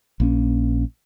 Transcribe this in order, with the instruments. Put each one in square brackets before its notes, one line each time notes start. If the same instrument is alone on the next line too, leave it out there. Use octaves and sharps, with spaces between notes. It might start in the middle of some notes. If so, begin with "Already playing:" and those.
[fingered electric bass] A#1 A#3 C#4